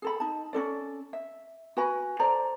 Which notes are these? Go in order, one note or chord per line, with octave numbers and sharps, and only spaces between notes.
G#4 A4 B5
D#4 A5
C#4 D#4 A4 D5
E5
F#4 B4 G#5 B5
A4 C5 D5 A#5